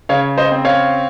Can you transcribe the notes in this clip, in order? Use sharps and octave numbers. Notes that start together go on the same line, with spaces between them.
C#3 C#5 F5
C5 D#5
C4
C#5 F5